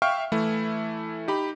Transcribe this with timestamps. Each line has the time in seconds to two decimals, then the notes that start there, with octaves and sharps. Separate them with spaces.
0.02 E5 F5 G5 C#6 F6
0.32 E3 A3 E4
1.28 D#4 G4 B5